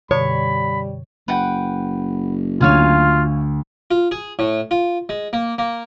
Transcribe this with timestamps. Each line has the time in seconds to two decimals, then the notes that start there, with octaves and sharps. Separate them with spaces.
0.11 F#2 B2 D3 G3 C#5 B5
1.28 F#1 B4 F#5 G5
2.61 D2 F4 C#5 F5 G#5
3.91 F4
4.11 G#4
4.39 A2
4.71 F4
5.09 G#3
5.33 A#3
5.58 A#3